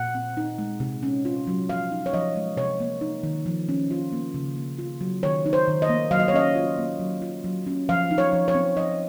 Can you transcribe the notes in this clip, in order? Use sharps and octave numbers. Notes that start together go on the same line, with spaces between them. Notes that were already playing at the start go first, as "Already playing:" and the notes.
Already playing: A#2 F#5
C4
D#4
G#3
C3
C#4
F4
F#3
F3 F5
D#4
C#5
F3 D#5
G#3
C3 C#5
A#3
D#4
D#3
F3
C#4
F4
A#3
C#3
A#3
F4
F#3
D#3 C#5
D#4
C5
D#3
D#5
A#3
F#3 F5
D#5
C#5
C#4 D#5
F4
A#3
F#3
F4
F#3
C#4
F3 F5
D#4
C#5
F3
C#5
C4
F3 D#5